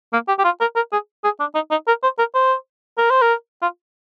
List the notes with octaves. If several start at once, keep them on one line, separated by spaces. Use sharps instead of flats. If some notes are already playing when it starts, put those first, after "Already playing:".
A#3
G4
G4
F4
A#4
A#4
G#4
G#4
D4
D#4
D#4
A#4
C5
A#4
C5
A#4
C5
A#4
F4